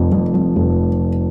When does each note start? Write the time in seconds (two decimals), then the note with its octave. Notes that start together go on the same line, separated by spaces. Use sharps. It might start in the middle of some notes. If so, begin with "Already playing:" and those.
Already playing: F1 F2
0.12 F2
0.34 F2
0.56 F1